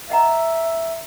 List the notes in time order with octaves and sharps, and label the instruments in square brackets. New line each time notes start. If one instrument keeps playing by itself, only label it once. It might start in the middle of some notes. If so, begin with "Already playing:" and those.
[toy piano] D#5 F#5 A#5 [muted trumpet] E5